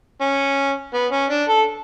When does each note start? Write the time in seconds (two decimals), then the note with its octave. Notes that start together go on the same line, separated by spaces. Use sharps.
0.21 C#4
0.94 B3
1.12 C#4
1.30 D4
1.49 A4